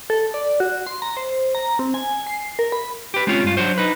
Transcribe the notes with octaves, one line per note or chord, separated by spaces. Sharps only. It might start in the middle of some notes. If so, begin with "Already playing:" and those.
A4
D5
F#4
C6
A#5
C5
A#5
C4
G#5
C7
A#4
B5
G4 B4
G#3 C4 C#4 F4
G2 F4
F#3 D4 F#4 C5
D#4 B4